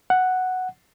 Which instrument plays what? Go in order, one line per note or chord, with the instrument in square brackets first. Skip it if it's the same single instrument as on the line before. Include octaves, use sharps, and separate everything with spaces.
[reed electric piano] F#5